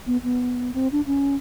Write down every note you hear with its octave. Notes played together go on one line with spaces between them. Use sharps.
B3
B3
C4
D4
C#4